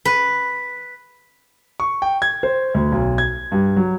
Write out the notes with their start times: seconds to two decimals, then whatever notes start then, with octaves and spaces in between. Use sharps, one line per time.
0.05 B4
1.80 C#6
2.02 G5
2.22 G#6
2.43 C5
2.74 D2
2.92 B1
3.18 G#6
3.52 G2
3.76 F#3